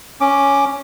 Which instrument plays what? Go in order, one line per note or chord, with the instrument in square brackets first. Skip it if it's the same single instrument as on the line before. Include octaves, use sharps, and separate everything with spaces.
[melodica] C#4 D6